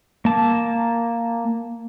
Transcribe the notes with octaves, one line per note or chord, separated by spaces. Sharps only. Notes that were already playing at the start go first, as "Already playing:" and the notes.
A#3 A5